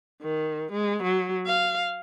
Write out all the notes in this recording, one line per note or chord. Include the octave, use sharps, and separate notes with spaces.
D#3
G#3
F#3
F5